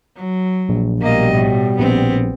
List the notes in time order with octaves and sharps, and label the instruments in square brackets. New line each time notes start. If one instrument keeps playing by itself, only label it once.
[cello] F#3
[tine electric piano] A#1
[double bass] B2 G3 [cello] A#3 D#5
[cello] A2
[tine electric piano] A#1 [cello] B3 C4